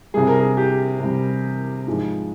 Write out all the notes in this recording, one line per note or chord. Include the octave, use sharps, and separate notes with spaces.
C3 G3 G#4
A#4
G#4
G4
C3 G3
G#2 F3 G#3